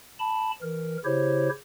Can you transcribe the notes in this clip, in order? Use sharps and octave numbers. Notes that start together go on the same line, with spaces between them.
A5 B5
E3 A#4
C#3 E4 G4 C5 C#5